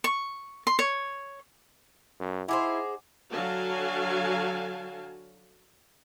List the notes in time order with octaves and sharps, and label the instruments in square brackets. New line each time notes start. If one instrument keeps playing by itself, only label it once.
[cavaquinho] C#6
C6
C#5
[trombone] F#2
[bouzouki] D#4 G#4 C5 [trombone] E4 [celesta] F#5 G#5 D6
[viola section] D3 F#3 F#4 F5 G#5 A5